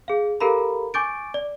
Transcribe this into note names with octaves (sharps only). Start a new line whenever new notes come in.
G#4 F5
G4 A4 A#4 F5 A#5 B5
G#5 C#6 D6 G6 A6 D7
D5